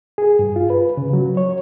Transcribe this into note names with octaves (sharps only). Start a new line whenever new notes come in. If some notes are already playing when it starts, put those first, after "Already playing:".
G#4
G2
F4
B4
C#3
F#3
C#5